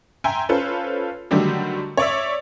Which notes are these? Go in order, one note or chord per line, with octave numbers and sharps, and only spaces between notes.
E5 G5 G#5 A#5 C6
C#4 F4 A4 B4 C5
D3 D#3 F#3 G3 A3 G4
C#5 D5 E5